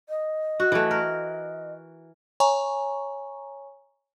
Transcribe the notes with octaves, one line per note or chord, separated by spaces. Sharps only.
D#5
F#4
E3 A3
A#4
C#5 G#5 A#5 C#6